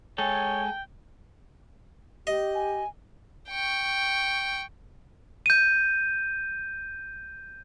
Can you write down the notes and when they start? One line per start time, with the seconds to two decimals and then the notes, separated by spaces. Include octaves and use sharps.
0.18 G#3 A4 C#5 G5 G#5
2.27 G4 D#5
2.55 G#5
3.49 G5 C#6
5.46 G6 D#7